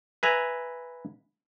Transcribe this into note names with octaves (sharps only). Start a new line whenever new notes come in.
B4 E5 G#5 A#5